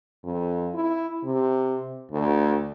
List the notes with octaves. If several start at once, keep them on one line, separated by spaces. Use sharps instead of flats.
F2
E4
C3
D2